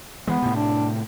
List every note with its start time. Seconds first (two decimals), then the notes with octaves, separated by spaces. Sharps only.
0.27 E3 G#3 B3
0.42 A2 C3
0.55 D4